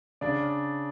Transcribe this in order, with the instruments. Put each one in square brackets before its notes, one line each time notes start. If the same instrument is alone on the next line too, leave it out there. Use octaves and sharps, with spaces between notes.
[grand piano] C#3 D4 D5